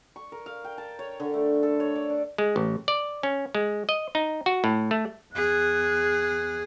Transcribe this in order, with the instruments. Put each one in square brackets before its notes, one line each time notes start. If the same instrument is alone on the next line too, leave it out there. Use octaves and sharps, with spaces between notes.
[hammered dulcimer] C#6
A#4
F5
G5
A5
C#5
D3
A3
A4
C#5
D5
D4
[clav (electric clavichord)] G#3
A1
D5
C#4
G#3
D#5
D#4
F#4
A2
A3
[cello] E2 G#4 [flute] F#6